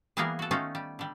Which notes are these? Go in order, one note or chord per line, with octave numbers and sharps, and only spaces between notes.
E3 G3 A#3 B3 G#4 A#4
F#4 A4
D#3 A3 C#4 D#4 F4
G3
D3 G3